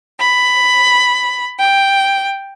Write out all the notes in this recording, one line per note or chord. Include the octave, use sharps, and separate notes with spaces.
B5
G5